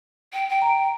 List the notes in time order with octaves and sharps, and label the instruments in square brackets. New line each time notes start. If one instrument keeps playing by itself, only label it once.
[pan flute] G5
G5
[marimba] A#5